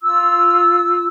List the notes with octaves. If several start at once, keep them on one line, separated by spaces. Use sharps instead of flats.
F4 E6